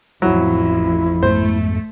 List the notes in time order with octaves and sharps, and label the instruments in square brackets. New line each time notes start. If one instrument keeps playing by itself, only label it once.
[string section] A1 F2 [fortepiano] F#3 [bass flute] E4
[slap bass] F2 G#2 B3 [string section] A3 [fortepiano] C5